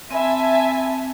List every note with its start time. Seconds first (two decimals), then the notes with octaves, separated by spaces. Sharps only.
0.11 C4 E5 G#5 A5 B5